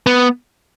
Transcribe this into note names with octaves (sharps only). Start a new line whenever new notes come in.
B3